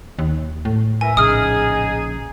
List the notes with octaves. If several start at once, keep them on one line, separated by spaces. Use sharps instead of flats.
D#2
A2
E3 A#4 E5 G#5
A#1 C#3 D#4 G#4 D#6 F6